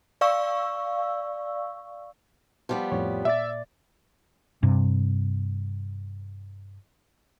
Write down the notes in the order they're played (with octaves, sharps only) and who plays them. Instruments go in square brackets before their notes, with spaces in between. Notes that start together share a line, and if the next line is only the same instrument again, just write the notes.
[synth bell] D5 F5 C#6 E6
[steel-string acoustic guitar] F3 G3 B3
[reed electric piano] F2 A2 C#5
[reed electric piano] A#2 D5 A6 [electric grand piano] E5
[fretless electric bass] G2 C3